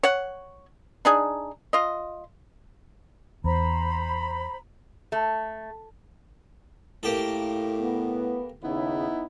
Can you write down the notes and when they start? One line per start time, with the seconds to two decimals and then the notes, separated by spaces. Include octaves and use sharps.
0.03 C#5 F#5
1.05 D4 D#4 G#4
1.73 F4 D#5
3.44 E2 C5 A#5 B5
5.12 A3
7.03 A2 A#3 G4 A4
7.80 B3
8.63 D#2 C#3 B3 D#4 E4